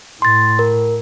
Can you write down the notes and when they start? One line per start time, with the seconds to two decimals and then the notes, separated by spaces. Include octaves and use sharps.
0.22 A2 C6 A6
0.59 A#4